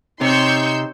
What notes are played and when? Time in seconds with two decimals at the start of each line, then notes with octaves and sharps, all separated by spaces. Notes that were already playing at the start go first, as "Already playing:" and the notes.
0.21 C3 D#4 C#5 C6 C#6 E6 G6